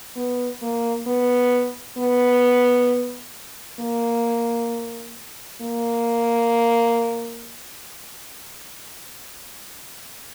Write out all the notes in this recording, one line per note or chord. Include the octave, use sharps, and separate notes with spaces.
B3
A#3
B3
B3
A#3
A#3